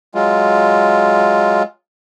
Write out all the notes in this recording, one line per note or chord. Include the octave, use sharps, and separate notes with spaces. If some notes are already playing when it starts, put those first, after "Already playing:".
F#3 G#3 F4